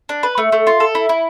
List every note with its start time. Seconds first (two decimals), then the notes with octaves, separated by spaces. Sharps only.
0.09 D4
0.23 B4
0.38 A3
0.52 A3
0.67 F4
0.80 A4
0.95 E4
1.09 E4